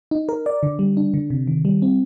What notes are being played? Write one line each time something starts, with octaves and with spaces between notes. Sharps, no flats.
D#4
A#4
D5
D3
G3
D4
D3
C3
D#3
G3
C4